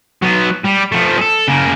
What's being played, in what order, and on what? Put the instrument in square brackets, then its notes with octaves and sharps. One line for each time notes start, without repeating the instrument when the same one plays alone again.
[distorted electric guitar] F#3 B3
G3
F3 A3
G#4 A4
C#3 A#3